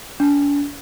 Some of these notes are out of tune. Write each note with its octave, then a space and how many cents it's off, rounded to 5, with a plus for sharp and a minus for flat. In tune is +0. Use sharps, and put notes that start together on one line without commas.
D4 -40